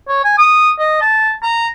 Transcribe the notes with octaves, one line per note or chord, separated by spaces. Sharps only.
C#5
G#5
D#6
D#5
A5
A#5